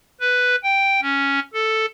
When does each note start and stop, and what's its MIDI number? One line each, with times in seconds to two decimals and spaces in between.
0.21 0.56 71
0.63 1.00 79
1.02 1.40 61
1.54 1.86 69